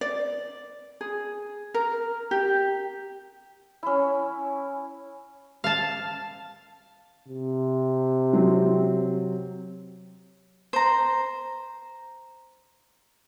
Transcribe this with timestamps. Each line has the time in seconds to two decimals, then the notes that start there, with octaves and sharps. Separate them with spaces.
0.01 D5
1.01 G#4
1.74 A#4
2.31 G4
3.83 C#4 E4
5.64 F5 A5
7.27 C3
8.33 F#3 C4
10.73 C5 A#5